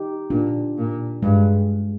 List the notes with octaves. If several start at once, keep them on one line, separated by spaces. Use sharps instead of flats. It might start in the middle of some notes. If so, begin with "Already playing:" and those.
Already playing: D#4 G4
A#2 D4 F4
A#2
G2 G#3